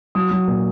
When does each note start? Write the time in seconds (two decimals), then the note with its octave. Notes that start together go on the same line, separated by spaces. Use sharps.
0.15 F#3 D#6
0.31 F#3
0.48 A#2